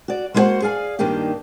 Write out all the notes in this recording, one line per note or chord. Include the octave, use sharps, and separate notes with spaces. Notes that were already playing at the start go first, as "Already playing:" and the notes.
F#4 D5
G#3 A#3 E4 F#4 C5 F#5
G#4 D5 F5 G#5
G2 D#3 A#3 D4 D#4 G4